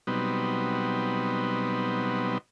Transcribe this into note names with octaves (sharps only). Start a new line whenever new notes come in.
B2 F#3 G3 B3 C4 D#4